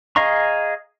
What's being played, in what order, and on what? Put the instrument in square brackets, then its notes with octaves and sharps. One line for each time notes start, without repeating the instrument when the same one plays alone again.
[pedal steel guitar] G#4 D#5 F5 A#5 C#6